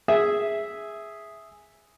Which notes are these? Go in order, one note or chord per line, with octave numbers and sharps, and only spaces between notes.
G#4 E5